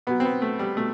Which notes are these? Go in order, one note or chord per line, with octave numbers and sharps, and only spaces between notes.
B2 F#3 B3
C4
B3
A3
G3
B2 A3